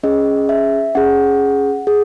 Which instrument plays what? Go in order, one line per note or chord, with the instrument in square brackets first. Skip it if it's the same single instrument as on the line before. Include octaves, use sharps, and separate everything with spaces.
[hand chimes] C#4 G#4 D#5
E5
C#4 G#4 F#5
G#4